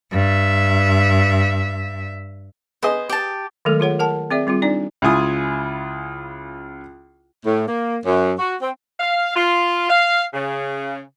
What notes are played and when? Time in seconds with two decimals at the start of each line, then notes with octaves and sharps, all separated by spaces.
0.12 G2 E5
2.83 B3 G#4 C5 D#5
3.09 G4 A5
3.65 D#3 F#3 G#3 A3 A4 A#4
3.80 F4 G#4 C#5 F#5
3.99 A#4 F#5 A5
4.31 C4 G#4 D5 E5
4.47 G3 C4 F4 G#4
4.62 D4 D#4 D5
5.02 C#2 E4 F4 G#5 D#6
7.45 A2
7.67 A#3
8.05 F#2
8.39 F#4
8.61 C4
9.00 F5
9.35 F4
9.89 F5
10.34 C#3